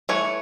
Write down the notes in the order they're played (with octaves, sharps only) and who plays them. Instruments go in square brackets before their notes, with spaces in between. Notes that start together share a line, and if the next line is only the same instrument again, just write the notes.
[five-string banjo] E3 A3 C#5